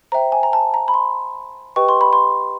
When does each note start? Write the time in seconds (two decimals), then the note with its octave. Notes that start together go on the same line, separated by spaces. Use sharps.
0.12 C5 E5 G5 A#5
0.32 G#5
0.43 A#5
0.53 A5
0.74 A#5
0.88 B5
0.94 C6
1.76 G4 B4 D#5 G5 C#6
1.89 C6
2.01 B5
2.13 C6